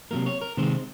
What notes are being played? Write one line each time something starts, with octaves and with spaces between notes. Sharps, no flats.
C3 F#3 A#3 A#4
C#5
A#4
C3 D#3 G#3 C5